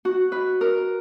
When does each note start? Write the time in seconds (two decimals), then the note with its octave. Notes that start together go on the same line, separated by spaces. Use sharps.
0.05 F#4
0.32 B4
0.61 A#4